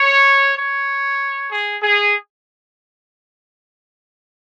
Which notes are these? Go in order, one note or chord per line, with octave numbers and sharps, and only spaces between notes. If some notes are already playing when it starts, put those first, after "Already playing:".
Already playing: C#5
C#5
G#4
G#4